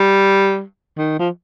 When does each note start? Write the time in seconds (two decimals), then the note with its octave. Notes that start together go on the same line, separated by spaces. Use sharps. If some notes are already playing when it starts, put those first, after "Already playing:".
Already playing: G3
0.98 D#3
1.19 F3